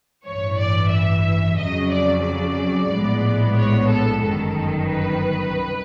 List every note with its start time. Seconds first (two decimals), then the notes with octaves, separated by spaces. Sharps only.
0.24 A1 G2 E3 C#5
0.58 D5
0.91 E5
1.57 F2 C#3 F#3 D#5
1.90 D5
2.23 D5
2.90 A#1 A2 F3 G#3 B3
3.55 C#5
3.89 A4
4.22 G1 F#2 D#3 A4
4.88 B4
5.54 C2